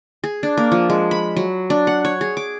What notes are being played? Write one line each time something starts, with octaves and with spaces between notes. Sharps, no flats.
G#4
D4
A#3
F3
G#3
B5
F#3
D4
F#5
C#5
G#4
D6